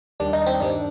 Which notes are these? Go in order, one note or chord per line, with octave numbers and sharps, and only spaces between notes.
D#2 D#3 G3 D4
D#4
C4
G2 D#3 G3 D4